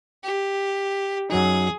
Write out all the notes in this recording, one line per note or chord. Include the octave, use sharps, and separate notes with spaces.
G4
F#2 F#3 D#4 G#4